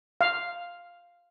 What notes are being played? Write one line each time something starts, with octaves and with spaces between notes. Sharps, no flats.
F5